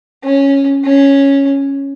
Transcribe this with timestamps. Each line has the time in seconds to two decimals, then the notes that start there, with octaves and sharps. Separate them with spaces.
0.24 C#4
0.84 C#4